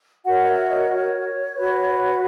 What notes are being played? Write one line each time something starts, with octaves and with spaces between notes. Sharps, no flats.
F#4 A#4 C#5 F#5
D#5
E5
D#5
C#5
F#4 B4